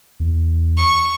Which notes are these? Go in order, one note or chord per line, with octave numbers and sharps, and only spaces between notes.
E2
C#6